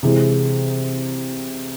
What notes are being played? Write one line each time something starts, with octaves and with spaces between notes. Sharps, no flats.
C3 E3 G#3